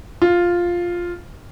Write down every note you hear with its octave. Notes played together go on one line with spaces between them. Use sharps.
F4